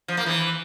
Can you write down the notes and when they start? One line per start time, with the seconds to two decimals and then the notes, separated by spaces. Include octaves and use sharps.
0.08 F3
0.17 A#3
0.26 E3